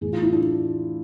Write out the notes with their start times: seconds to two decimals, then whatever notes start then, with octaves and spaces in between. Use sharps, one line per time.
0.01 A2 E3 G#4
0.13 F4
0.22 E4
0.33 D4